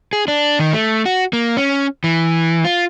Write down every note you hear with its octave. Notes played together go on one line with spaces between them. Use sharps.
G#4
D4
D#3
A3
F#4
A#3
C#4
E3
F4